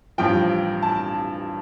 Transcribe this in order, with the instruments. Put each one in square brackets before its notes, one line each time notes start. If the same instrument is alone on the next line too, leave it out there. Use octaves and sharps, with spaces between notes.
[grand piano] A1 G2 F3 G5
A5